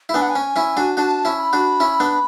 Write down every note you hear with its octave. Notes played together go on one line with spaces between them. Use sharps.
E4
B3 D4 G#5
F#5
G#5
C#4
C#4 E4
D4 F#4
D4 F#4 A5
C#4 E4
B5
D4 F#4
C#4 E4
B3 D4